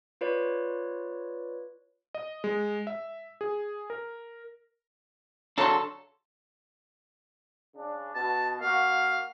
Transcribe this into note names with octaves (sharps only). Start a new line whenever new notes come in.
F4 B4 C#5 D5
D#5
G#3
E5
G#4
A#4
C#3 F#3 D4 A4 C6
C#3 D4
B2 A5
A#3 F#4 F5